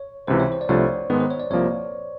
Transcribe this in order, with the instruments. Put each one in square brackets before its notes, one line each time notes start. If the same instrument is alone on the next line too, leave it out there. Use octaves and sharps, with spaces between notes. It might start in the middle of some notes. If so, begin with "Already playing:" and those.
Already playing: [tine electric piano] C#5
[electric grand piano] C#2 C3 E3 [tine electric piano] C5
[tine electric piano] C#5
C5
D5
[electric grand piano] C2 C3 F3 A3 D4 [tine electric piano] C#5
[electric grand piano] G#2 D#3 G#3 B3 [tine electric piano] B4
[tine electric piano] C5
C#5
D5
[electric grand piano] C2 C3 F3 A#3 [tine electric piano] C#5